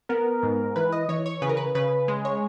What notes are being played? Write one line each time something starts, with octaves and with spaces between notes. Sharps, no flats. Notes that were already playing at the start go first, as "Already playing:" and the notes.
B3 A#4
G#2
E3 B4
D#5
E3 C#5
C#5
C#3 B4
A#4
B4
C#3 B4
G#3
C#5